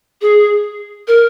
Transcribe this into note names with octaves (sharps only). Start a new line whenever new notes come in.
G#4
A#4